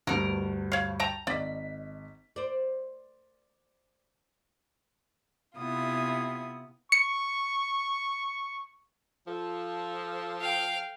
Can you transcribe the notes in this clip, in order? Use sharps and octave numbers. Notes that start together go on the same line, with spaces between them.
D2 G2 B2 A#4
C#5 F5
G5 A5 A#5
G#1 D5 D#5 B6
C5 D5
C3 B3 E4 F4 D#6
C#6 C#7
F3 A4
F5 G5